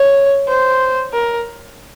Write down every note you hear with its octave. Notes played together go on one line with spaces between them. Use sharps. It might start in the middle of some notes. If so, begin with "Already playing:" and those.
Already playing: C#5
C5
A#4